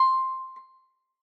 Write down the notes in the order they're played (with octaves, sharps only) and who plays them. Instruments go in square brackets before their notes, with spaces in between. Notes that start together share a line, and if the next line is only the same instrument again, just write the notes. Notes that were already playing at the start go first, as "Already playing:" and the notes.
Already playing: [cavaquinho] C6